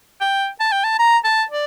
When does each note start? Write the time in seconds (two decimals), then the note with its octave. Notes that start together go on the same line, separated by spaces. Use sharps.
0.21 G5
0.60 A5
0.72 G5
0.84 A5
0.99 A#5
1.25 A5
1.51 D5